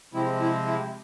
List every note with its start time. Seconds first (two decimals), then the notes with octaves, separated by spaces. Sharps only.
0.13 C3 F3 G#3 C4 E4
0.40 E4
0.67 E4